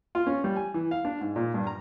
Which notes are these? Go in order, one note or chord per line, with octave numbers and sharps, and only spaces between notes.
F4
C#4
G3
G#5
E3
F5
D4
G#2
A#2
G2
A#5